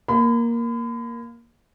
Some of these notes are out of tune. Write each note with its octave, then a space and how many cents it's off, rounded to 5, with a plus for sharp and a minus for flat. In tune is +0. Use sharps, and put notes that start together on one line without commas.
A#3 +5 B5 +40